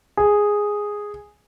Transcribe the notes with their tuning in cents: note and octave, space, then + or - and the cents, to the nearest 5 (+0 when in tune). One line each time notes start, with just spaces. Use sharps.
G#4 -5